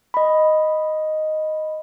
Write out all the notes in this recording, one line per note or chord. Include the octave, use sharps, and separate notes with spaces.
D#5 B5